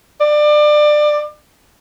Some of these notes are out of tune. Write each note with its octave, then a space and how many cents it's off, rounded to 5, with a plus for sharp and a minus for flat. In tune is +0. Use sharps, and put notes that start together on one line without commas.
D5 +25